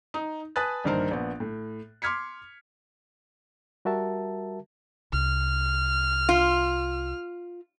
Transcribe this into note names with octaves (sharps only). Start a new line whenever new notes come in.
D#4
B4 G#5 A5 D#6 F#6 A6
A#1 G2 D#3 A#4 C5
A#1 B3
A2
C6 D6 F6 G#6 B6 C#7
G3 F#4 A#4 E5 A5
C2 F6
F4